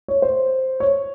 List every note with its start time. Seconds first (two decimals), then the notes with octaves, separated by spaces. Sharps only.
0.08 C#5
0.22 C5
0.80 C#5